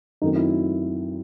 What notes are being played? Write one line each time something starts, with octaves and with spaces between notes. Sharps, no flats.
F#2 D#3 F#3 A3 C4 D#4
E4